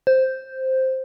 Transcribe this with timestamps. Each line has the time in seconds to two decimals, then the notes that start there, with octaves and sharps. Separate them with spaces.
0.07 C5